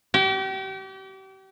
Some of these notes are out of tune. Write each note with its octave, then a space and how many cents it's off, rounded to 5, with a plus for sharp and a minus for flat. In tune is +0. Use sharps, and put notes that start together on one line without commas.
G4 -35